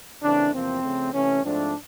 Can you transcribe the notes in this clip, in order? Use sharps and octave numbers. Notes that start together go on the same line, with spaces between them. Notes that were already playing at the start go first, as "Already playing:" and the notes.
C#3 E3 A3 C4 D4
E2 C3 F3 A#3 C4
C#3 F3 A3
C3 E3 A3 C#4
G#2 F3 A3 C4 D4